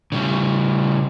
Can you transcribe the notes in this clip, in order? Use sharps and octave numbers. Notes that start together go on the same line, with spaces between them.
C#3 G3